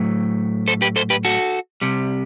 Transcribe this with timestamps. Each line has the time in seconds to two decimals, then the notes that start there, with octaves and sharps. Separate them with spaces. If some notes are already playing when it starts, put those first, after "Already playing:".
Already playing: A2 F#3 A3
0.68 A4 C5
0.82 G4 B4
0.96 A4 C5
1.10 G4 B4
1.25 F#4 A4
1.82 C2 C3 G3